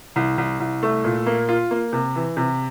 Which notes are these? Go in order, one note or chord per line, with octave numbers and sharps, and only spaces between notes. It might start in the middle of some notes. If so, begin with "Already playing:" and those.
C2
C2
C2
A3
A#2
A#3
F4
A#3
C3
E3
C3